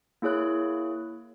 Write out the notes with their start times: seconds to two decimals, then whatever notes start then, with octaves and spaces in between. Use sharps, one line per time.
0.22 A#3 E4 G#4 C#5 F#6